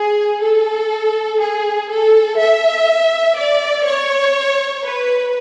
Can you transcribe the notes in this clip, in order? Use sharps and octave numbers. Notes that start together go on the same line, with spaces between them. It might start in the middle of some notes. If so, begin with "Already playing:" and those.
Already playing: G#4
A4
G#4
A4
E5
D5
C#5
B4